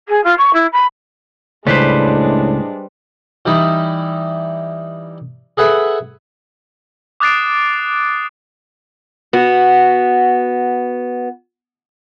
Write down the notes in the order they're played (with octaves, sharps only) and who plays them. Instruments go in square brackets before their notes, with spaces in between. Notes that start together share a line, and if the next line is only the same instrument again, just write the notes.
[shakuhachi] G#4
F4
C#6
E4
B5
[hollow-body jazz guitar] C#2 [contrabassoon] A2 [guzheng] G3 B4 C5 [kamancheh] G#3 D4
[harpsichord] E3 G3 D#4 E4
G#4 A4 B4 E5 F#5 G#5
[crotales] D6 D#6 F#6 A6 C7 D7
[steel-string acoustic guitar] B3 F#4